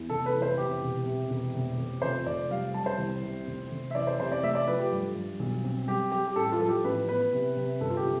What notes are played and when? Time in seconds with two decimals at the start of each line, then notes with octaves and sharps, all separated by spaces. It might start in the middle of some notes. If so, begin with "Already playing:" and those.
Already playing: E2
0.10 F1 A4
0.26 B4
0.34 E3
0.42 C5
0.57 C3 G4
0.82 E1
1.05 C3
1.30 E1
1.54 F1
1.78 F1
2.02 F2 C5
2.26 F1 D5
2.50 G3 F5
2.74 G3 A5
2.86 C5
2.98 C2
3.23 C3
3.47 F1
3.71 F1
3.91 E5
3.94 E3 D5
4.07 C5
4.19 C3 C5
4.32 D5
4.43 A3 E5
4.55 D5
4.67 F3 B4
4.80 G4
4.92 G2
5.15 G2
5.39 B1
5.64 C4
5.88 G3 G4
6.12 G3 G4
6.27 G4
6.36 A1 A4
6.52 F4
6.61 F3 A4
6.68 G4
6.84 A1 B4
7.09 B3 B4
7.33 C3
7.57 C3
7.81 G1 A4
7.90 F4
7.97 G4
8.05 C3